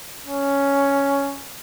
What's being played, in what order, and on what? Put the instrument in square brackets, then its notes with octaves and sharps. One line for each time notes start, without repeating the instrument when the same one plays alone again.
[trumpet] C#4